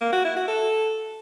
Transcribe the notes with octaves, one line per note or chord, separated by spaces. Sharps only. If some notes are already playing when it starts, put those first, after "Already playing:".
A#3
F#4
E4
F#4
A4